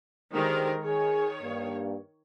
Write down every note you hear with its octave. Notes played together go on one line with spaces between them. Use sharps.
D3 D#3 G#3 G4 A#4 C5
D#3 G#4 C#5
G2 A#3